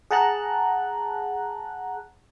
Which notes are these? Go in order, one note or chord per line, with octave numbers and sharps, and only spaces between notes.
G#4 F#5 A5 A#5 F#6